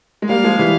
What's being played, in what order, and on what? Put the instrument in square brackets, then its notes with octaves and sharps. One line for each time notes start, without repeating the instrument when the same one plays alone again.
[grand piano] G#3
[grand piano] G3 A#3 [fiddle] F5
[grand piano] F3 G#3
E3 G3